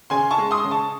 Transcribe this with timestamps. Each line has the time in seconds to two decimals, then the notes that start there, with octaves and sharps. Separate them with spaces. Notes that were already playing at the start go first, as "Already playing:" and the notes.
0.10 C#3 G#5 C6
0.31 A5 C#6
0.38 G#3
0.51 C6 D#6
0.64 C#3
0.71 A5 C#6